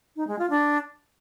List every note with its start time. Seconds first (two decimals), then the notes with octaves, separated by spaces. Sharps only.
0.16 D#4
0.27 G#3
0.39 F4
0.50 D4